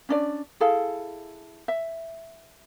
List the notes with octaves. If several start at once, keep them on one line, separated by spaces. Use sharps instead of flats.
C#4 D4 D5
E4 G#4 A4 F5
E5